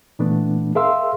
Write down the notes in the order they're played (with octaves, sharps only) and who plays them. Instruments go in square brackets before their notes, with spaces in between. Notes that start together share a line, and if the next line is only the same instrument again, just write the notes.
[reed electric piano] A#2 E3 A3 B3 D4
G#4 A#4 E5 F5 C6 E6